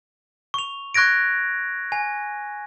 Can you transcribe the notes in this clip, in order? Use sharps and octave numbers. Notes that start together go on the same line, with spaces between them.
C#6 F7
C#6 F#6 G#6 A#6 D7
G#5